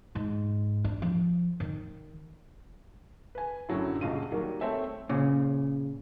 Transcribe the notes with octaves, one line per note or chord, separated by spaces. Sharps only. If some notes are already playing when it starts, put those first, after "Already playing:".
G#2
D4
F3
D#3
B4 G#5
F#2 A2 D3 F#3 E4
D#1 C#2 F4 D#7
D#3 F#3 G3 A#3
A3 C4 C#5 E5
A#2 C#3